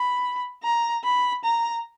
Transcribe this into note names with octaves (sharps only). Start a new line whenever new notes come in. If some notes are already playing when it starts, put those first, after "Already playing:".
Already playing: B5
A#5
B5
A#5